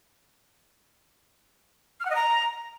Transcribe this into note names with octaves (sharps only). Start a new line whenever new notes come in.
F6
F#5
D#5
A#5